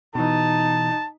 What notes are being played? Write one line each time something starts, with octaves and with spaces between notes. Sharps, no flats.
B2 E3 D#4 A5